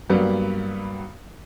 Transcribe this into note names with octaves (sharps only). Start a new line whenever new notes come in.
G2 F#3 G3 A#3 B3